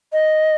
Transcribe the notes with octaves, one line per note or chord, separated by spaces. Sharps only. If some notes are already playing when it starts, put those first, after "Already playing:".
D#5